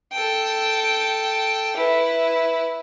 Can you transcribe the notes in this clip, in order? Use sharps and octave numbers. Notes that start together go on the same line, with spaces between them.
A4 G5
E4 B4